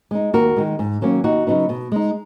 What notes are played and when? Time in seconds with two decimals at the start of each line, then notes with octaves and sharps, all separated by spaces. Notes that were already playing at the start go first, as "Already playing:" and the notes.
0.11 G#3 D#4
0.33 D#2 F#4 A#4
0.56 D#3 G#3
0.79 G#2
1.01 D#3 F#3 A#3 C#4
1.24 D#2 D#4 F#4
1.47 C#3 F#3 B3 D#4
1.69 B2
1.92 G#3 D#4